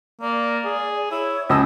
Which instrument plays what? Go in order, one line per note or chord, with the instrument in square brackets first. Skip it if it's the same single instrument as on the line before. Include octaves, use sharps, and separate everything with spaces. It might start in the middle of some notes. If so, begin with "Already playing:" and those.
[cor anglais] A#3 [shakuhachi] D5
[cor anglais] G#4
[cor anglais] E4 [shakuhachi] C#5
[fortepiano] C#2 E6 [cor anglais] D#5 [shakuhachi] A5